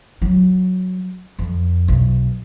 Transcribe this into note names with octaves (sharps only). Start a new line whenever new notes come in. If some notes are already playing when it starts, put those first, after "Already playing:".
F#3
F2
B1